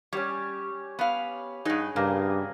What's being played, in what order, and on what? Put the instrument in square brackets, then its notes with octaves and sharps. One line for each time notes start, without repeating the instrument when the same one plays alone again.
[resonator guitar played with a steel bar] G3 [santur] C#4 G4 C#5
[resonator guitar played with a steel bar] B3 F5 [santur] B5
[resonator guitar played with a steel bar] G2 D#4 [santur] G#4 D#5 F#5
[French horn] G2 [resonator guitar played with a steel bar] C#3 [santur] A#3